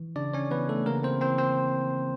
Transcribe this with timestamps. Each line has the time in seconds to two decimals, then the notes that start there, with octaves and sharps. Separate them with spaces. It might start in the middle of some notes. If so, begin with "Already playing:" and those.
Already playing: E3
0.16 C#3 D4 D5
0.33 C#4 C#5
0.51 E3 B3 B4
0.69 A3 A4
0.86 C#3 A#3 A#4
1.03 C4 C5
1.21 E3 C4 C5
1.38 C4 C5